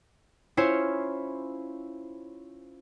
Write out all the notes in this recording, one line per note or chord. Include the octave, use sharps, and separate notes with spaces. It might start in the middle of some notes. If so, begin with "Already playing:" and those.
C#4 E4 F4 C5 C#5